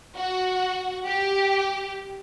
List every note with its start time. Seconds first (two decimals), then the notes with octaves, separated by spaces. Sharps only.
0.17 F#4
1.07 G4